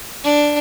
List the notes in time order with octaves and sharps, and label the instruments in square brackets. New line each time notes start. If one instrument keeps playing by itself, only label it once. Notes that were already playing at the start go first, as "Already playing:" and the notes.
[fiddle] D4